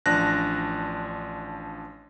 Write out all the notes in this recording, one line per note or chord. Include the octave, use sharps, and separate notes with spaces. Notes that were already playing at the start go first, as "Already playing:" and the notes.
A1 F3 D4 F#6 A#6